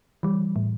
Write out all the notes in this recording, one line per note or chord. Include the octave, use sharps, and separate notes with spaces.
E3 G3
A2